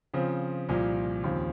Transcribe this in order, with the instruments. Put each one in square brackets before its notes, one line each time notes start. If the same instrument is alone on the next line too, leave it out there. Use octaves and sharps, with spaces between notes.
[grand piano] C#3 F3 C4
C2 A#2 F3
D#2 C#3 F3 C4